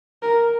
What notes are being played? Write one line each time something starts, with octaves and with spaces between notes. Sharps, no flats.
A#4